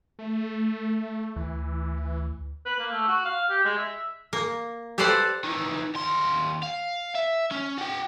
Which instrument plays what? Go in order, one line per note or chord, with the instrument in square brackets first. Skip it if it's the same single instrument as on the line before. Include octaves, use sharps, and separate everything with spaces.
[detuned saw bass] A3
[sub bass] D2 [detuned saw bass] E3
[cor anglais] B4
A#3
A3
F#4
F5
G4
G#3
E5
[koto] A#3
G4 A4 B4 C5 D5 F5
[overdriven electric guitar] D#3 E3
D#2 C6
F5
E5
C#4
F#4 G5